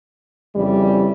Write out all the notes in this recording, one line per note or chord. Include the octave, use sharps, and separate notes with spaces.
F2 C#3 E3 G3